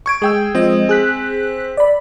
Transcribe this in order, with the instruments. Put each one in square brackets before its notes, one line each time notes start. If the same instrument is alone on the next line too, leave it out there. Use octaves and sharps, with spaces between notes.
[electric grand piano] C#6 G#6 D7
[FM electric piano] G#3 [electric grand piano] G#4 G5 E6
[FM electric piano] F3 G#3 D#5 [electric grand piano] C4
[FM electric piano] G#4 F#6 B6
D5 B5